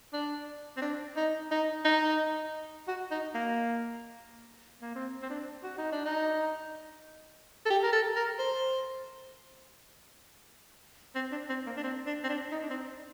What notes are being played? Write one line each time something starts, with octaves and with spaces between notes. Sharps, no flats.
D4
C4
D4
D#4
D#4
D#4
F#4
D#4
A#3
A#3
C4
C4
D4
F#4
D#4
D4
D#4
A4
G4
A#4
A4
A#4
C5
C4
D4
C4
A#3
D4
C4
D4
C4
D4
D#4
D4
C4